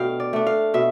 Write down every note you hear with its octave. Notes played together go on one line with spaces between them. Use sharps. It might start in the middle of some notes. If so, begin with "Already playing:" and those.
Already playing: B2 A3 D4 F5 G5
D5
A3 D4
F5
B2 E5